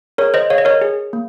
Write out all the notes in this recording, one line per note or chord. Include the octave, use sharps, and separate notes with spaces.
G#4 A#4 C#5
C5 D#5
G#4 C#5 F5
D#5
A#4 C#5
G#4
A#3